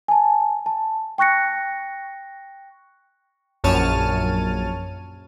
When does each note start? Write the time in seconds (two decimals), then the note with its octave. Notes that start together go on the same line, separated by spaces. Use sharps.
0.08 G#5 A5
0.66 A5
1.18 G5 C#6 F#6 A#6 C#7
3.64 A#1 F#2 C#5 A5 F6 D#7